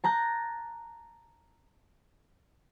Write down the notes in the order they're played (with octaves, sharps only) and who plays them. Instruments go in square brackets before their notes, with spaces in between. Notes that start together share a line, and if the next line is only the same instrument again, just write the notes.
[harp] A5 A#5 F#6 G6